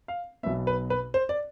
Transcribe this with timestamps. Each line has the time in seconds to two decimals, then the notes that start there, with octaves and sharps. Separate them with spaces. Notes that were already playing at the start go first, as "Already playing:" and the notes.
0.08 F5
0.43 B1 B2 B3 E5
0.67 B4
0.90 B4
1.14 C5
1.29 D5